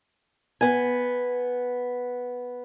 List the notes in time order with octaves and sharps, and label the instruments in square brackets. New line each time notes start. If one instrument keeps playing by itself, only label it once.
[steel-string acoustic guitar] B3 G#5